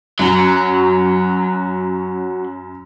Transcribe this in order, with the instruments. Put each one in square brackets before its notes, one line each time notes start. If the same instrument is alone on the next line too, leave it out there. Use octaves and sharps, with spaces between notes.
[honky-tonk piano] F#2 [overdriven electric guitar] F#3